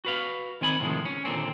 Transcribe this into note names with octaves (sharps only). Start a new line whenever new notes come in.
F#4 B4 F5
D#3 C4 G#5 B5
A2 C3 D#3 F3 G#3
C#4
D#2 A#2 D3 C4